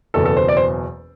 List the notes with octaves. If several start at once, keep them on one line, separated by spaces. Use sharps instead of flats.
F#1 E2 B2 F#3 B3 A4
A4
C5
D5
C5